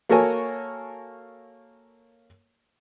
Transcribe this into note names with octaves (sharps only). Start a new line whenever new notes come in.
A#3 F#4 A4 A#4 C#5 G#5